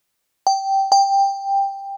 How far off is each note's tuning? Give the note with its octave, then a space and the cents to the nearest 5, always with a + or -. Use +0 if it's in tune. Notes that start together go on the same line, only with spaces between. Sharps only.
G5 -10
G5 +10